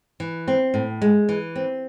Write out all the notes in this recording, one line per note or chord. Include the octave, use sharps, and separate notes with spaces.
E3
C4
A2
G#3
E3
C4